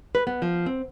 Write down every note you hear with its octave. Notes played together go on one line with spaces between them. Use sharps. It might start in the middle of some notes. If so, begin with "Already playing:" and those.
B4
B3
F3
C4